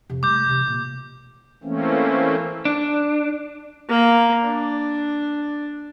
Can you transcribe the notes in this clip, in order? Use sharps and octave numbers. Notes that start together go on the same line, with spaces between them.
F2 C3
G3 A3 D6 G6
C3 E3
A#2
E3 A3 A#3 C4 C#4
D4
A#3
D4